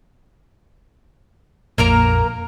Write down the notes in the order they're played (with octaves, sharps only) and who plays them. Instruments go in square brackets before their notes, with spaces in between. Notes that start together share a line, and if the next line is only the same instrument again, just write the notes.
[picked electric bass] A#1 F2 [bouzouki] A#3 A#4 A#5